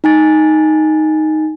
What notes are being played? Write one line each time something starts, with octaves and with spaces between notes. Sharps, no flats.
D#4 G#5 A6